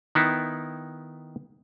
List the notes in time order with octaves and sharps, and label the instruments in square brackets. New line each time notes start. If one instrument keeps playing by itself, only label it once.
[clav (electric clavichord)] D#3 B3 D#4 E4